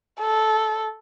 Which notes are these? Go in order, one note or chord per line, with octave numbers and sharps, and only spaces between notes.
A4